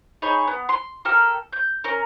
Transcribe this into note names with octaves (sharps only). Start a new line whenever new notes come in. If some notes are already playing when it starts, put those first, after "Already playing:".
D#4 G#4 C#5 B5
B3
C6
G4 A4 A#4 F6
G6
C#4 A#4